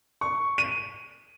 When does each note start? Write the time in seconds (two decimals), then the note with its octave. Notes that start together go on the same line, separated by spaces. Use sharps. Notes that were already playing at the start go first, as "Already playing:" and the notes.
0.21 C#6
0.58 D#7